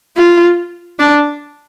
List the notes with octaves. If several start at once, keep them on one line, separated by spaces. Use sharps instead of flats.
F4
D4